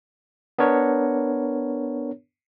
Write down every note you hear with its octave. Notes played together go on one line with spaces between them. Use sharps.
B3 D4 A#4 C#5